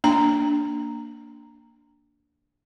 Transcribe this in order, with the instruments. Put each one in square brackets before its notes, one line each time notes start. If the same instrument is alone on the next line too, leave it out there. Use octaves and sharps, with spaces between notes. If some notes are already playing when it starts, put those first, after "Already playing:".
[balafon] A#3 D4 A#5